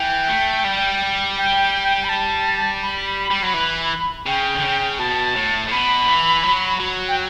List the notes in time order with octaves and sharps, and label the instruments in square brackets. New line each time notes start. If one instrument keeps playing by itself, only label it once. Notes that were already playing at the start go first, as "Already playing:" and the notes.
Already playing: [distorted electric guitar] E3 [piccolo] G5
[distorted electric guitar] A3
G3
[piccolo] G5
B5
A5
B5
[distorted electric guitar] G3
F#3
E3
[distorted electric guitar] C#3 [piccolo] G5
[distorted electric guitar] D3
C#3
[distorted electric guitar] B2 [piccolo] A5
[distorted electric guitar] A2
A2
[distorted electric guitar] B2 [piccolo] B5
[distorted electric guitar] D3
E3
F#3
F#3
[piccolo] G5